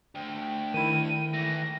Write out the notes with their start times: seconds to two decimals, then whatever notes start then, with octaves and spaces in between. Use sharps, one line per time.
0.15 D2 G5
0.74 D#3 E4 D#7
1.34 E3 A3 A#6